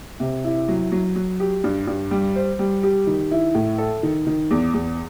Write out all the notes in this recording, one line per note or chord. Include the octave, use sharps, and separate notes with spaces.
C3
E4
F#3
F#3
F#3
G4
G2
G2
G3
C5
G3
G4
D#3
E4
A2
A4
D#3
D#3
E2
E2